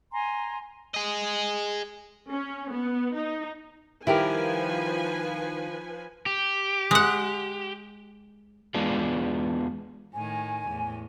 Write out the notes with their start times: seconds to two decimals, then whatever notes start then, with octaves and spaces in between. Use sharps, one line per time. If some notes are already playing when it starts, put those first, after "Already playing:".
0.13 G#5 A#5 C6
0.94 G#4 D#5
2.30 C#4
2.71 B3
3.15 D#4
4.07 D#3 F3 G3 E4 G4 A#4 B4 G#5
6.26 G4
6.91 G#3 F#5
8.74 E2 G#3 B3 D4 F4 G#4
10.14 A2 D#3 G#5
10.69 E2 A2